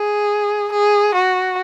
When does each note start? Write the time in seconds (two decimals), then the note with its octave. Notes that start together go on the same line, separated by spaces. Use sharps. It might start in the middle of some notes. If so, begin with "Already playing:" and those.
Already playing: G#4
0.72 G#4
1.14 F#4